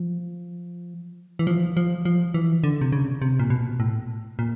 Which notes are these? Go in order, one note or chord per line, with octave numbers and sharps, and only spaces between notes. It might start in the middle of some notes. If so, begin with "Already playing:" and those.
Already playing: F3
E3
F3
F3
F3
E3
D3
C3
C#3
C3
A#2
B2
A2
A#2